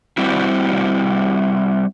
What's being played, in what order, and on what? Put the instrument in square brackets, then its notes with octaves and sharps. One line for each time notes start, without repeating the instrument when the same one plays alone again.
[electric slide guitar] G3 C4 E4 F#4